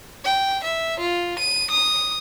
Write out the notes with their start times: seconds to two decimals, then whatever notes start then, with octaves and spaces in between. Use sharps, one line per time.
0.25 G5
0.64 E5
0.99 F4
1.39 D#7
1.71 D#6